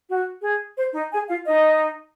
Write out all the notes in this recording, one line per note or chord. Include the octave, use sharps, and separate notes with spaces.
F#4
G#4
C5
D#4 D#5
G#4 G#5
F4 F5
D#4 D#5